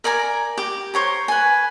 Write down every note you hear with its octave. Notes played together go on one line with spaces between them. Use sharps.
A#4 D5 G#5 A#5
G4
C5 C#5 A#5
B4 G#5